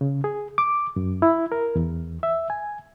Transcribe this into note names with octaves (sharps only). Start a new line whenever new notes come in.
C#3
G#4
D6
F#2
E4
A#4
E2
E5
G#5